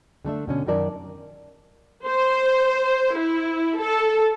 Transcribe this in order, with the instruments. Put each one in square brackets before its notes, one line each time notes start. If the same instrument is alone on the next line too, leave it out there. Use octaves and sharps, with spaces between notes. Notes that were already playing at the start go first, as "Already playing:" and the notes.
[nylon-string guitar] D3 A3 D4 E5
B2 D3 C#4
F#2 D#3 D#4 A#4 D5 A5
[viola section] C5
E4
A4